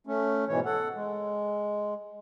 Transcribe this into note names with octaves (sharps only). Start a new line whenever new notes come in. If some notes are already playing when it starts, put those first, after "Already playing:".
A3 C#4
G#2 B2 E3 C#5
A4 F#5
G#3